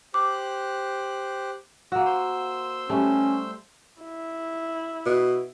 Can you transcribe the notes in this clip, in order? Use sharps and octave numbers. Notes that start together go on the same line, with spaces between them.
G4 C5 D6 F#6
A#3 F#4 E6
C5 C6 E6
G3 A3 C#4
E4
B2